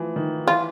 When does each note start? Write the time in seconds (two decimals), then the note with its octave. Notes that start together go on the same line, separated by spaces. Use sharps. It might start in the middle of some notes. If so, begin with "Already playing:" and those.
Already playing: E3 F3 A3
0.16 D#3
0.47 E3 F4